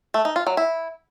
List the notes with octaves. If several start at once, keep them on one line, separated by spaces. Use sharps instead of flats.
A3
D#4
F4
F#3
E4